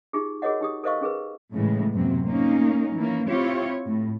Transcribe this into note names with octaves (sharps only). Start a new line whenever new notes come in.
D#4 F4 G4 G#4
F#4 G#4 A#4 C#5 D#5 F#5
D#4 G4 D#6
A4 A#4 C5 D#5 F5 C#6
C#4 G#4 A#4 B4
A2 C#3 E3 G#3
F#2 C3 F#3 A#3 C4
A#3 C#4 D#4
E3 A#3 C#4
C4 E4 F4 G4 C#5
A2